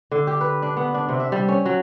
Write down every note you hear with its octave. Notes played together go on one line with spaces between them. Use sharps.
D3
G4
B4
D4
B3
D4
C3
E5
G3
C#4
F#3